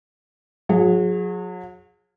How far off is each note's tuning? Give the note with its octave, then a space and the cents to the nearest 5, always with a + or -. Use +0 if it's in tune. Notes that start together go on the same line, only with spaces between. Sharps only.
F#3 -35 G#4 +0